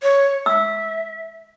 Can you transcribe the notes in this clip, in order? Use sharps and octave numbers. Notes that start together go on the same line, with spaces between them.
C#5
E5 E6